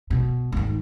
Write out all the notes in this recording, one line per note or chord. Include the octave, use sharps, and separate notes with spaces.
B2
G#2 D#3